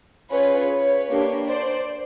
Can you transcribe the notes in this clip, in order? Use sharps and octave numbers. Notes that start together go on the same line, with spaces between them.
C#4 F4 G#4 B4 C#5
B4 C#5
A#3 D4 G4
C5 D5